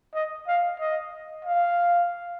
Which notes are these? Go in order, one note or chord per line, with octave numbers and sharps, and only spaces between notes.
D#5
F5
D#5
F5